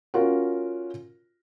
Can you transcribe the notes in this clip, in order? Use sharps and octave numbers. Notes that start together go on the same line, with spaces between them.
C#4 F4 F#4 A#4